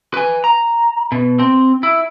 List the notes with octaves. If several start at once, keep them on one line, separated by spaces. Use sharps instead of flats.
B4 G#5
A#5
B2
C4
E4